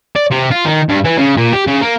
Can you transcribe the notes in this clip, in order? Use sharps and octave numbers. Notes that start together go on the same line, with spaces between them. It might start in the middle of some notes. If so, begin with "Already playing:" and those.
D5
C3
F4
D#3
G2
E3
C#3
A#2
G4
C#3
A#3